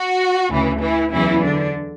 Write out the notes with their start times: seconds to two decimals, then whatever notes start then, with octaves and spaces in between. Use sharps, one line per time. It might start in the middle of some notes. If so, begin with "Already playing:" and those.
Already playing: F#4
0.49 D2 C#3 E3
0.81 E3 E4
1.11 E2 C#3 E3 F#3 E4
1.43 D3 D4